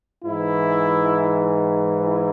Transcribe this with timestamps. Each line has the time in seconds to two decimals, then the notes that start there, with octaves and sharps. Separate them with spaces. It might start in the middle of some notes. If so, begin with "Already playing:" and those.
0.24 G#2 E3 E4
2.02 E4